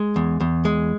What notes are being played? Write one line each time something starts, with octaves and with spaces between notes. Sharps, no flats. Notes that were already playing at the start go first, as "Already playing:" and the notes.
Already playing: G#3
E2
E2
G#3